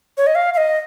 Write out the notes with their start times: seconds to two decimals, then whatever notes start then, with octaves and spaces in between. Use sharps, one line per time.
0.17 C#5
0.27 D#5
0.35 F5
0.54 F5
0.57 D#5